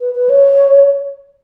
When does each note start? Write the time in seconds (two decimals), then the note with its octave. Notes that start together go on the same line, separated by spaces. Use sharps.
0.01 B4
0.15 B4
0.29 C#5